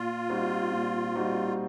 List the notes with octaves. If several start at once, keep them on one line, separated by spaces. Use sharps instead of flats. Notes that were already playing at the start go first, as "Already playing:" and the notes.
Already playing: A#2 F4
G3 C4 D#4 F#4
A#2
G3 C4 D#4 F#4